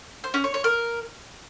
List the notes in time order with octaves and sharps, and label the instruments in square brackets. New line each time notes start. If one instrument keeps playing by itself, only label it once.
[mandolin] C5
C#4
C#5
C#5
A#4